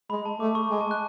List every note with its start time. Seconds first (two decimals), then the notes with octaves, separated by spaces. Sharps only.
0.10 G#3 B5
0.26 A5
0.40 A3 D6
0.55 C#6
0.71 G#3 G#5
0.81 A5
0.91 F#6